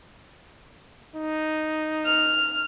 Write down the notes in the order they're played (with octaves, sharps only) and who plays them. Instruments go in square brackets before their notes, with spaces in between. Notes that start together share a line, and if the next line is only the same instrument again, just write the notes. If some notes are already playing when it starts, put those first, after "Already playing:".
[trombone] D#4
[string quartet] F6